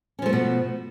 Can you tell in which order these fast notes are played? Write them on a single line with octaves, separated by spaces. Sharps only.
C#4 F3 A3 B3 B2